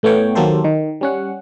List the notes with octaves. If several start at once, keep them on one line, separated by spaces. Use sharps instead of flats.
A2 A3 B3 C#5 G5
D#2 F#3 A#3 G4 A4 C5
D#3
G3 C#4 F#5